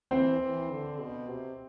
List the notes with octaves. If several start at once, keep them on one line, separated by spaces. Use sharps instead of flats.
E3 C4 C5
E3
D3
B2
C3